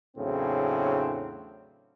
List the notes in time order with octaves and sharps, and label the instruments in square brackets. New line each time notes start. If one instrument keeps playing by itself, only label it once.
[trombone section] E2 A2 C#3 F#3 C4 D4